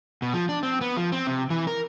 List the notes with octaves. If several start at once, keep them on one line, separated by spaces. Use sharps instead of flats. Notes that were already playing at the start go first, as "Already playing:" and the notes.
B2
F3
D4
C4
B3
F3
C4
C3
E3
A#4